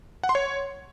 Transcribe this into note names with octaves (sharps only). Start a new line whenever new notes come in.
F#5
C6
C#5